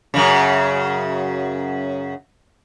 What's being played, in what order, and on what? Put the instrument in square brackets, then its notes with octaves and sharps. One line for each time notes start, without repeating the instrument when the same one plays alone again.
[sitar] F#2 C#3